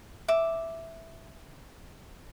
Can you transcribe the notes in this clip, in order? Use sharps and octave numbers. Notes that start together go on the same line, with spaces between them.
E5 D6